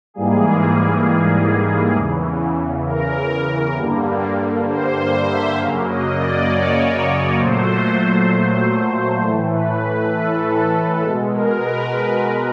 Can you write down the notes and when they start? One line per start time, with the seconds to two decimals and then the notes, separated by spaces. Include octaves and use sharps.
0.14 G#2 E3 G3 A#3 G#4
1.95 E2 C#3 E3
2.86 A#4
3.76 G2 D3 G3 A#3
4.68 C5
4.98 C5
5.27 E5
5.58 F#2 C#3 F#3 A#3 F5
5.88 D#5
6.18 D5
6.48 C#5
7.39 A#2 F#3 A3 C5
9.20 A2 E3 A3 C5
9.51 B4
9.81 B4
10.11 A4
11.01 B2 G#3 A4
11.32 A#4
11.62 B4